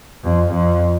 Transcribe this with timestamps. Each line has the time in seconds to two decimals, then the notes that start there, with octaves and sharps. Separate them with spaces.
0.23 F2
0.51 F2